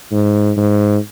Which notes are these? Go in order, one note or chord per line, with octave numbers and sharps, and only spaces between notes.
G#2
G#2